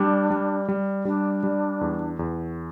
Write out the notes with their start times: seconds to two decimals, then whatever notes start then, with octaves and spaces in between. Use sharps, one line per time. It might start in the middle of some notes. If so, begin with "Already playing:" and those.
Already playing: G3 D4
0.30 G3
0.69 G3
1.05 G3 D4
1.43 G3
1.81 E2
2.19 E2